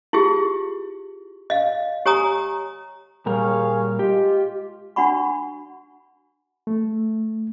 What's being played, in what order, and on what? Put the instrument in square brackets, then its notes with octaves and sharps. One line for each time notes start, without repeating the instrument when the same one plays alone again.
[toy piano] E4 F4 G4 G#4
D#5 F5
G4 C#5 G#5 A#5 D#6
[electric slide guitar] A#2 G3 A#4 [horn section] G#4 C#5 F5
[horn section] G#3 F4 [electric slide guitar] G4
[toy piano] D4 F#4 F#5 B5 C#6
[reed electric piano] A3